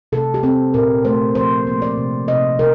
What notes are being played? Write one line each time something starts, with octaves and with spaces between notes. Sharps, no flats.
C3 A4
G4
C4 A4
A#2 A#4
A3 C5
F3 C5
A#3
D5
C3
C3 D#5
C3 A#4